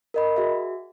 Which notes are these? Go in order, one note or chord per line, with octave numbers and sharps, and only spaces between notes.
A#4 D#5 B5
F#4 G#4 E5